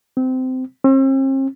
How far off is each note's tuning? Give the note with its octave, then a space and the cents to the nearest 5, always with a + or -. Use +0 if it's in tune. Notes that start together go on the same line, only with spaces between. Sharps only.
C4 -20
C4 +45